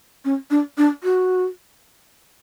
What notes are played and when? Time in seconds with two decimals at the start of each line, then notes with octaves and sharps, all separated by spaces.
0.25 C#4
0.51 D4
0.78 D4
1.04 F#4